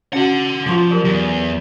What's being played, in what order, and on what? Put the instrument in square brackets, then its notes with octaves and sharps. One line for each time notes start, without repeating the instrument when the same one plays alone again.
[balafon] C#4 F#4 [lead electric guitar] A4 F#5
[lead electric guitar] F3 [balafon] F4 C6 D6
[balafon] F#3 G4 A#4
[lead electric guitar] E2